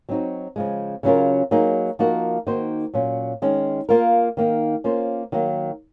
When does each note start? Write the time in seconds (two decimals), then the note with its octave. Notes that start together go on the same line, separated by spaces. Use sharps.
0.09 F#3 C4 D#4 F#4
0.56 C#3 F3 G#3
1.03 C#3 F#3 C#4 F4 A#4
1.51 F#3 A#3 D#4 G#4
1.99 F3 A#3 D#4 F#4 A#4
2.47 D#3 A#3 D#4 F#4 C5
2.94 A#2 F#3 C#4
3.42 D#3 G#3 C#4
3.89 A#3 F4 A#4
4.37 D#3 A#3 D#4
4.84 A#3 C#4 F4 C5
5.32 D#3 F#3 A#3